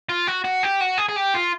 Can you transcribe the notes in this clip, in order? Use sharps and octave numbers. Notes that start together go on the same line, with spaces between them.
F4
F#4
F#4
G4
F#4
G#4
G#4
G4
F4